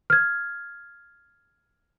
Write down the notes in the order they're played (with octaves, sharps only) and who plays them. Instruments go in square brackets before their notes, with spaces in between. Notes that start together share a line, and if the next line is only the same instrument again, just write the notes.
[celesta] F6 G#6